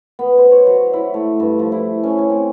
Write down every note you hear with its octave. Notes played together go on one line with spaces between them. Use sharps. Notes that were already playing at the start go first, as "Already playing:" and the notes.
B3
C5
C#5
F#3
E4
A3
G2
F3
E4
C#4
C#4
C4